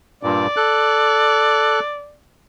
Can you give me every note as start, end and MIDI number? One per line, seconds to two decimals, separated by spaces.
0.23 0.47 43
0.23 0.47 46
0.23 2.15 74
0.57 1.80 69
0.57 1.80 90